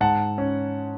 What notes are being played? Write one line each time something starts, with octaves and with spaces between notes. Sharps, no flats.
G#2 F#5 A5
C#4